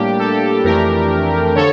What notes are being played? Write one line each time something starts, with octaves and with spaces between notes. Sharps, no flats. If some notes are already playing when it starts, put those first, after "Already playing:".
Already playing: A2 G3 A#3 D4 G4
A4
F2 E3 A3 D4 G4 A#4
D3 F3 A4 C#5